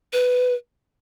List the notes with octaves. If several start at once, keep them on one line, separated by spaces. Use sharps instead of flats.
B4